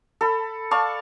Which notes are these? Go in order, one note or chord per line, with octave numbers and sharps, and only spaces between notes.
A4 B5
D5 F5 A5 C#6